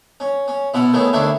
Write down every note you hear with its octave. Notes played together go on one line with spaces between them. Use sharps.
C#4
C#4
B2 E4 F4 F#5
D#3 A3 B3 C#4 E4
D2 D#3 D4 E4 C#5 E5